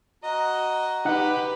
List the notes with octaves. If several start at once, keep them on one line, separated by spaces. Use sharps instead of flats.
F#4 D#5 A#5
D#4 G4 B4 F#5